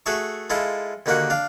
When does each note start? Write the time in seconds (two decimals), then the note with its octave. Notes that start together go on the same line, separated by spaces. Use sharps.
0.06 A3 F#4 G#4 E5 A5 C#6
0.50 G#3 E4 F4 A4 E5
1.06 D#2 D3 D#3 A#3 F#4 F#5
1.30 D4 F5